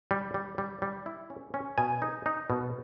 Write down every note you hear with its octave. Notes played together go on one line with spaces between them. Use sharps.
G3
G3
G3
G3
E4
C#4
C#4
B2 G#5
D#4
D#4
B2